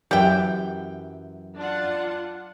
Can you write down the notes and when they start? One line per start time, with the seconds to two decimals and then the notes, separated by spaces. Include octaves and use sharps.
0.11 F#2 E3 F#3 G4 E5 G5
1.57 D4 F4 F#5